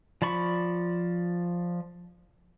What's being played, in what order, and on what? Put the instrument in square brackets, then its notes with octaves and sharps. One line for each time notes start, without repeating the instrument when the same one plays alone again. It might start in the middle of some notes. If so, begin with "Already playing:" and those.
[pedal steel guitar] F3 D5 B5 C#6